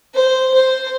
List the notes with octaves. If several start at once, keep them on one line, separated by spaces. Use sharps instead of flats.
C5
C5